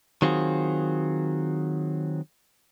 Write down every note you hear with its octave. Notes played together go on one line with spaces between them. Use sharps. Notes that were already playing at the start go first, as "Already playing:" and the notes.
D#3 F#3 C4 F4 F#4 G#4